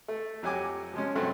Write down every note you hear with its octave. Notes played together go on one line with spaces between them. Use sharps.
A3
F2 F#3 G4 G#5 D6
F3 G#3 C#4
G2 C3 F#3 A3 C4